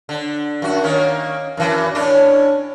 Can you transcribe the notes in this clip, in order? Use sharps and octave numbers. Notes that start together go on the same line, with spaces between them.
D3
F#2 F#4
D#3 A#3 C#4
F#2 E3
A2 C#4 D4